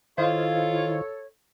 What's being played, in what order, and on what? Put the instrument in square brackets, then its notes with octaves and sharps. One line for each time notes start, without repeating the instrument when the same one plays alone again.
[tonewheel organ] D#3 E4 [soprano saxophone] F4 [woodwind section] A4 C#5 [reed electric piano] C5 D#5 F5